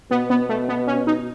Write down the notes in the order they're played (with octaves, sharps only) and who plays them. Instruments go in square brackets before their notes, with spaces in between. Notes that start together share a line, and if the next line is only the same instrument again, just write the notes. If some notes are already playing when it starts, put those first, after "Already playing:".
[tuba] B2 [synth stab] B3
[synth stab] B3
A3
B3
C#4
D#4